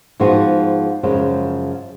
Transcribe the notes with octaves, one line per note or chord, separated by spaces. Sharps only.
G#2 F3 G#3 B3 F#4
F#2 C#3 F3 G#3